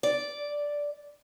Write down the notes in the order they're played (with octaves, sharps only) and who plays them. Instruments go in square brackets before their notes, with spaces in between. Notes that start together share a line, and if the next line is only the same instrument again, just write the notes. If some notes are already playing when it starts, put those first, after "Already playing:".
[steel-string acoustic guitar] D5